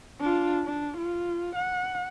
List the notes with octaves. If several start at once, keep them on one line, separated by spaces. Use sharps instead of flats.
D4 F4
D4
F4
F#5